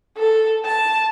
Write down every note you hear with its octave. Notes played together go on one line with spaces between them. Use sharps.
A4
A5